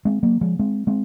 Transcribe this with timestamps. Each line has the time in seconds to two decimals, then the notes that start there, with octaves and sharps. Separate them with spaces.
0.05 G#3 C4
0.23 F#3 A#3
0.41 F3 G#3
0.59 G#3 C4
0.87 G#3 C4